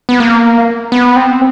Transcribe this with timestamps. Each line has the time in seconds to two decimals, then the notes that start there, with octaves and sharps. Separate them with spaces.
0.09 B3
0.20 A#3
0.92 B3
1.16 C4